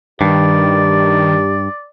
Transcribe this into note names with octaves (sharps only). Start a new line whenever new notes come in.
G2 D#3 G4 D5